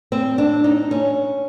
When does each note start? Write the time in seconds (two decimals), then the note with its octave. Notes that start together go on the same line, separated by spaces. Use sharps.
0.12 C4
0.38 D4
0.64 D#4
0.91 C#4